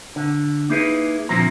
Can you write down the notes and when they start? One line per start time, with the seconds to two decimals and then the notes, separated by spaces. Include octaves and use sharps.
0.16 D3
0.70 A#3 D#4 E4 G#4 A#4 B4
1.29 A#2 D3 F3 C4 E4 A#5